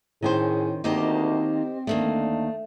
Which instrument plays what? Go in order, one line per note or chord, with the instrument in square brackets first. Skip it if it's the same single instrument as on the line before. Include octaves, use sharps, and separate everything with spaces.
[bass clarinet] A2 [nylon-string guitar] D#3 C#4 C5 [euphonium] G#4
[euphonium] D2 [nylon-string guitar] D#3 A#3 D#4 [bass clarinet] C4 [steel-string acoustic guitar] G4 C5 D#5
[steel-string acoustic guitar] D2 D#3 A#3 [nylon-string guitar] A3 [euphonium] D4